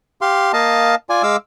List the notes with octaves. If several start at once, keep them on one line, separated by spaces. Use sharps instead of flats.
G4 F5 C6
A#3 D#5 F5 A5
F4 D5 G#5
G#3 F5 D6 E6